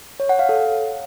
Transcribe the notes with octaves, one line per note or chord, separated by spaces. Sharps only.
C#5
F#5
F5
A4